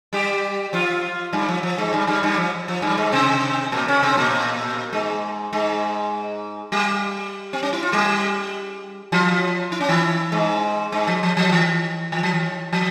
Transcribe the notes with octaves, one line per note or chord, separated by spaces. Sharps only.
G3 G4
F3 F4
G2 G3
F3
F3
G#2 G#3
G2 G3
G2 G3
G2 G3
F3
F3
G2 G3
G#2 G#3
C3 C4
A#2 A#3
C#3 C#4
C3 C4
A#2 A#3
G#2 G#3
G#2 G#3
G3 G4
C4
C#4
E4
F4
G3 G4
F3 F4
E4
C#4
E3 E4
G#2 G#3
G#2 G#3
F3
F3
F3
E3
E3
F3
E3
F3